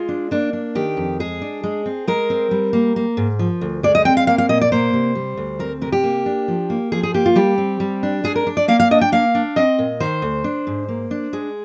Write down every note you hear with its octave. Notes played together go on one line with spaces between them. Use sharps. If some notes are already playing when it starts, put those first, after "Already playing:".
Already playing: G#3 F4
D4
A#3 D4
D4
D#3 G4
F2
G#3 G#4
D4
G#3
C4
G#3 A#4
C4
G3
A#3
A#3
G#2
F3
D2
G#3 D5
D#5
C4 G5
F5
A#3 F5
F5
A#2 D#5
D5
A#3 C5
C3
G3
D2
C4 A#4
C3 A#4
G4
A#3
D4
F3
A#3
F3 G#4
G#4
A#3 G4
F4
G3 G4
C4
G3
D4
G#3 G#4
A#4
D4
D5
A#3 F5
F5
D4 D#5
G5
A#3 F5
D4
C4 D#5
A#2
D#3 C5
D2
D4
G#2
A#3
D4
G#3 G#4